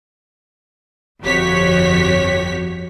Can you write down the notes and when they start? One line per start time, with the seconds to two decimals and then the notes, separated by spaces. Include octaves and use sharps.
1.21 G1 F2 F#4 G4 C#5 B6